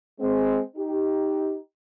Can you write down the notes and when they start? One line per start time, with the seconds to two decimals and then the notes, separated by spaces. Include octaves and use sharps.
0.20 G#3 C4
0.76 D#4 G4